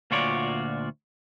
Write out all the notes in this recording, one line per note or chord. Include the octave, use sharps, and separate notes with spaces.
D2 A#2 F4 F#4 C#5 D5